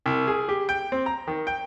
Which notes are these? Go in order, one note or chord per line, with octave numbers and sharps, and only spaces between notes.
C2
G#4
G4
G5
C4
A#5
D#3
G5